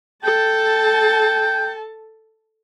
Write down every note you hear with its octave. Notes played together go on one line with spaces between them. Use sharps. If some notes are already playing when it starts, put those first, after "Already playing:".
A4 G5 A5